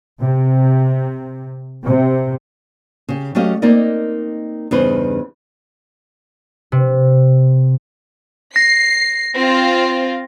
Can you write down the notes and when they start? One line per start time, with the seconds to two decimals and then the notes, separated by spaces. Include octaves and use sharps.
0.19 C3
1.85 C3
3.09 C#3 G4
3.35 F#3 A3 C#4 G4 D#5 F5
3.62 A#3 C4 D#4 A#4 D5 D#5
4.71 E2 G2 C#3 D#4 B4 C5
6.72 C3
8.56 A#6 C7
9.34 C4 F4